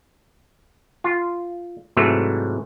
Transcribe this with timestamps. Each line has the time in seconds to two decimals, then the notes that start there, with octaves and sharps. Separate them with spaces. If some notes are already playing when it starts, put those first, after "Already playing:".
1.04 F4
1.97 G#2 C3 E3 F#3 A3